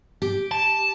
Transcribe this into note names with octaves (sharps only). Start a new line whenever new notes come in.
G4
A5